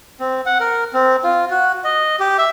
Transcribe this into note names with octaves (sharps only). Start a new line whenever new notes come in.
C4
F#5
A#4
C4
F4
F#4
D#5
G4
E5